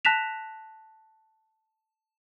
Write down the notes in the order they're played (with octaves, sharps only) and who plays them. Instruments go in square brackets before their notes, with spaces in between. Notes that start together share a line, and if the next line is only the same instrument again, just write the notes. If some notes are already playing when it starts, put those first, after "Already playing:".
[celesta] A5 F#6 A#6 B6 E7 F7